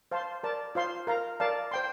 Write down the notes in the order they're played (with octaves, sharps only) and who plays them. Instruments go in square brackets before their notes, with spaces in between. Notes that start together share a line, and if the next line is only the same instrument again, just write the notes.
[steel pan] C5 F5 A5 C6
A#4 D5 A5
F4 C5 F5 C6
A#4 F5 A#5
A#4 D5 F5 A5
C5 G5 C6